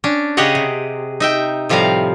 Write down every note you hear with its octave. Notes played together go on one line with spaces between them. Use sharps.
C#4 D4
C#3 G4 G#4 C#5 D#5 F#5
C3
D#4 E5 G5
A2 C3 F3 G3 F5 A#5